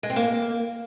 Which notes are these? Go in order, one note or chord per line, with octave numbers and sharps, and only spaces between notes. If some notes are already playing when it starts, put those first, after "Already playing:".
G#3
C4
A#3